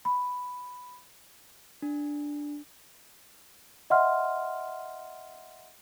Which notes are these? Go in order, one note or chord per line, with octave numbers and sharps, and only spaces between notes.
B5
D4
D#5 E5 F#5 C6 F6